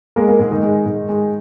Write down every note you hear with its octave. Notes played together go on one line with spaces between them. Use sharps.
G#3 A#3 A#4
A#3 A#4
G#2 G#3 G#4
D#3 D#4
G#3
G#2
G#3